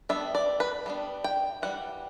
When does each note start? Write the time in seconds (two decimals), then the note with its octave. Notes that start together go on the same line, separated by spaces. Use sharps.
0.09 G3 B3 D4 E5
0.35 D5
0.60 B4
0.86 G3 B3 D4
1.24 G5
1.62 E3 G3 F#5